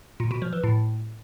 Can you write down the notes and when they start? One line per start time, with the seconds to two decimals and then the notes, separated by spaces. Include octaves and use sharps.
0.20 A#2
0.31 B2
0.42 F3
0.53 E3
0.64 A2